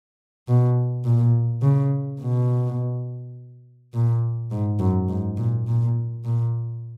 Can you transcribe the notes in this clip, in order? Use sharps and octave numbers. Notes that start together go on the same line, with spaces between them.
B2
A#2
C#3
B2
A#2
G#2
F#2
G#2
A#2
A#2
A#2